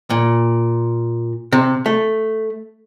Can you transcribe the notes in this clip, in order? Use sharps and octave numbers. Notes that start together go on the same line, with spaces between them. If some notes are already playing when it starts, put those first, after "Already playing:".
A#2
C3
A3